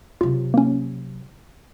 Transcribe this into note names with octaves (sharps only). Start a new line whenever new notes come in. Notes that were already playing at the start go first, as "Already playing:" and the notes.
C3 F#3 F4
A#3 C#4